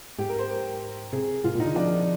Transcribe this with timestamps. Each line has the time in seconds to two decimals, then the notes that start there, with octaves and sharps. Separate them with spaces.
0.18 G#2 G4
0.29 A#4
0.39 C5
0.50 A#4
1.13 C3 G#4
1.44 G#2 F4
1.55 A#2 D#4
1.65 D3
1.75 F3 D4